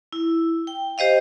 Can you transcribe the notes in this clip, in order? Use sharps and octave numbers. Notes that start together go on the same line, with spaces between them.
E4
G5
G4 C5 D#5 F5